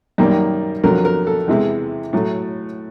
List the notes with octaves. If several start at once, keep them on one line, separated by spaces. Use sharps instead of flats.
F#2 D#3 G3 A#3
F2 D3 F#3 A#4
A#4
A4
E2 C3 E3 G#3
A2 F#3 A3